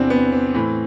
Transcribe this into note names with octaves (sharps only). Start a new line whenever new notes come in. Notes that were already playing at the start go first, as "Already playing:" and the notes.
Already playing: E2 C3 E3 C4 D4
B3
C4
A2 E3